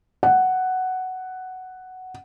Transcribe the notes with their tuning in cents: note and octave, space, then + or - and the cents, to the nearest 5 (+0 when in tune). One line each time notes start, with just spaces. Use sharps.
F#5 +5